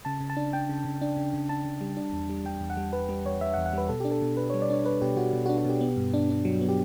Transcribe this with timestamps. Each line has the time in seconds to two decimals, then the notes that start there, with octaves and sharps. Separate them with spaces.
0.05 C#3 A5
0.21 C#3
0.30 A5
0.37 D4
0.53 D4 G5
0.69 C#3
0.85 C#3
1.02 D4
1.17 C#3
1.34 C#3
1.49 D4 A5
1.65 C#3
1.81 G3
1.97 D4
2.13 E2
2.29 G3
2.45 G3 G5
2.61 E2
2.70 F#5
2.77 G3
2.93 G3 B4
3.09 G3 B4
3.25 E2 C#5
3.41 G3 E5
3.54 F#5
3.57 E2
3.66 F#5
3.73 G3 B4
3.89 B2 A4
4.00 D4 G4
4.11 A4
4.22 B2
4.37 D4 B4
4.50 G3 C#5
4.62 D5
4.70 D4 C#5
4.85 D4 B4
5.02 B2 G4
5.17 B2 F#4
5.33 B2
5.46 F#4
5.49 D4
5.58 F#4
5.65 B2 G4
5.81 B3
5.97 G2
6.14 D4
6.30 D4
6.45 F#3
6.61 B3
6.69 G4